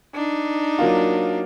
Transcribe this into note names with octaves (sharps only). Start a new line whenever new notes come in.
D4 D#4
F#3 A#3 F4